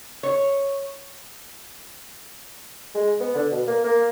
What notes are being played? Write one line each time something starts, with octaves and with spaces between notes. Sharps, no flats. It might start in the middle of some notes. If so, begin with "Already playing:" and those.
C#5
G#3
B3
D3
B2
A#3
A#3